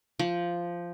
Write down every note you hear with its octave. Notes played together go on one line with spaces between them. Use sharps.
F3